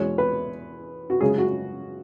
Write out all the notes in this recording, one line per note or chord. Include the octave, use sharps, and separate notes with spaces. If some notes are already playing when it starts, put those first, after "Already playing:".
Already playing: E2 B2 G#3 C#5
B4
F#4
F#2 C#3 G#3 C#4 G#4
F#4